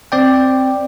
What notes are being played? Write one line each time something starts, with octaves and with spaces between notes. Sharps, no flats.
C4 D5 G5